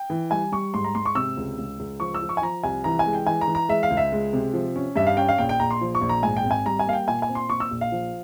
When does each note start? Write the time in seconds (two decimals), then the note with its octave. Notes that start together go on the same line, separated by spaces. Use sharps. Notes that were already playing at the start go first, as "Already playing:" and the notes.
Already playing: G5
0.10 E3
0.31 G3 G#5
0.52 G3 C#6
0.74 G#2 C6
0.84 A#5
0.95 G#2 C6
1.06 C#6
1.15 C3 E6
1.37 C#2
1.58 C#2
1.79 C#2
2.00 F3 C#6
2.14 E6
2.22 F3
2.29 C#6
2.37 G#5
2.42 F3 A#5
2.63 C2 G#5
2.84 E3 A#5
2.99 G#5
3.06 G#3
3.13 G5
3.26 E3 G#5
3.41 A#5
3.48 E3
3.55 A#5
3.69 G#3 E5
3.83 F5
3.90 C#2
3.97 E5
4.12 G#3
4.33 C3
4.53 F3
4.76 C#4
4.96 G2 E5
5.07 F5
5.17 C#4 G5
5.28 F5
5.38 A#1 G5
5.49 G5
5.60 A#1 A#5
5.71 C6
5.81 F3
5.95 C#6
6.01 A#1
6.09 A#5
6.22 G#2 G#5
6.37 G5
6.44 G#1
6.51 G#5
6.66 G3 A#5
6.79 G#5
6.86 A#3 F5
6.93 G5
7.08 A#2 G#5
7.22 G#5
7.29 C4
7.35 C6
7.49 A#2 C#6
7.60 E6
7.71 A#1
7.81 F5
7.92 F3